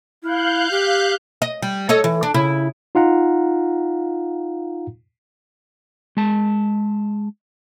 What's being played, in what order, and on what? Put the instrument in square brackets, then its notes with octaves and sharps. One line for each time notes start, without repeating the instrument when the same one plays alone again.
[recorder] E4 [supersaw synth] F5 F#6 G6
[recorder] G4
[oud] D#5
G3
A4 C#5 D#5
E3
D4
C#3 E4
[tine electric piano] D#4 F4 F5 F#5 A#5
[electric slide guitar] G#3 A5